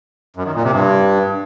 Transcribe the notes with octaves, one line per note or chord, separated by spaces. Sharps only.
F#2
D#3
A#2
C3
G2